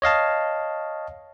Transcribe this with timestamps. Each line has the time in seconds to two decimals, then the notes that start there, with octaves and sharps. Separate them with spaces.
0.02 C#5 D#5 F5 A5